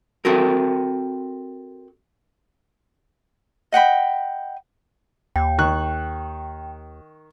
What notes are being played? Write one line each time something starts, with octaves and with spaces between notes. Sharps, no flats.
C4 F#4 A4 A#4
D#5 F#5 G5 B5
D#2 G5
D#3 C#6 F#6